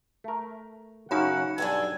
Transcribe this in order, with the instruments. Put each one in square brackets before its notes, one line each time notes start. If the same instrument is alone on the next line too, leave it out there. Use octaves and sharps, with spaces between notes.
[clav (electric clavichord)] A3 A#4
[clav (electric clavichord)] F#2 C#3 [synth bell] D#4 F#4 B5 [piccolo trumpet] F#5
[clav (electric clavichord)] B1 G2 [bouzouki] D4 G#4 A4 [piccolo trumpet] G#6